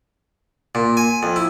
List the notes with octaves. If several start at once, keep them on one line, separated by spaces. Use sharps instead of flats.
A#2
G#5
F2
E4